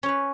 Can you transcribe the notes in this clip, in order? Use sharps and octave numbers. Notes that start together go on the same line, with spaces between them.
C#4 B4 C#5